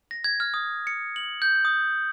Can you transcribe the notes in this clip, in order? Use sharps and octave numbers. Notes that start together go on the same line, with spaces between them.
A#6
G#6
F6
D#6
C#7
F#7
G6
D#6